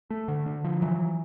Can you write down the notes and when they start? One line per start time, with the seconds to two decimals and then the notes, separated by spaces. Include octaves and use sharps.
0.10 A3
0.28 D3
0.46 D3
0.64 F3
0.82 E3 F#3